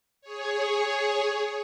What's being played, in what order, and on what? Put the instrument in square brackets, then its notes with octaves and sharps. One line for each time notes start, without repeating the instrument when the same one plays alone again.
[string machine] G#4 C#5